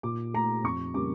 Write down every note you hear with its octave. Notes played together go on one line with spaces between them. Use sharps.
A#2 D6
A3 A#5
F2 C#6
C#3 G3 A#3 D6